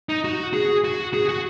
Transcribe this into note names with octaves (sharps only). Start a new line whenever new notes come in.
D#4
F#4
G#4
F#4
G#4
F#4